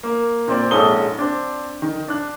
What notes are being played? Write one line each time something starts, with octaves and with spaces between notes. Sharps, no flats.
A#3
A#2 C4 D5
A#1 G#2 C#4 A4 D#6 G7
C4 D4
D#3
D4 F#6